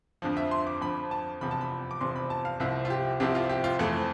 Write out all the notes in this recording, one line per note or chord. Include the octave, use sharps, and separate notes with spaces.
F2 D3 F3
E5
C6
D6
F2 D3 F3 B5
A5
F1 E2 C3 F3 B5
A5
B5
D6
F1 E2 C3 F3 C6
B5
A5
F5
C2 C3 F3 C4 E4 E5
F4
G4
C2 C3 F3 C4 E4 G4
F4
G4
F4
F2 E3 A3 C4 A4